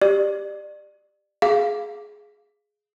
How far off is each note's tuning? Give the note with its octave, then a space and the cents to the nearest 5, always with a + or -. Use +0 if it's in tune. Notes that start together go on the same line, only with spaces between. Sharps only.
G4 +10 D5 +30
G#4 +10 F5 -5